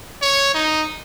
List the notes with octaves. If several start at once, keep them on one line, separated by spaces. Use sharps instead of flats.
C#5
D#4